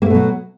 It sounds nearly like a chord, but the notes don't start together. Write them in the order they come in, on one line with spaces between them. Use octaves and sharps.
A#3 A3 B2 F#3